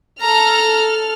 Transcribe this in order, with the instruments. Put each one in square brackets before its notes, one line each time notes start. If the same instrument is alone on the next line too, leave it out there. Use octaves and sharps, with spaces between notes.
[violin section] A4 F6 [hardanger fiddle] A#5